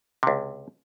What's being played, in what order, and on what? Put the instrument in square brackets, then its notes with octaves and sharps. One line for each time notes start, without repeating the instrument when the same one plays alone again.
[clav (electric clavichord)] C#2 C3